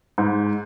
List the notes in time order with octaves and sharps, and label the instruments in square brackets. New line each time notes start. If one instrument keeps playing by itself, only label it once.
[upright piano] G#2